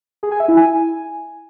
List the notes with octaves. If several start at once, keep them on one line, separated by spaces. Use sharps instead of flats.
G#4
G#5
E5
E4
G#5